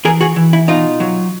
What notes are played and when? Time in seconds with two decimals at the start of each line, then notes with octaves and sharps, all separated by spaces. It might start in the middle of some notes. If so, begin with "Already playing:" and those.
0.05 E3 G#4 A#4
0.21 F#4 G#4
0.36 E3
0.53 E4
0.68 B2 D#4 F4
1.00 F#3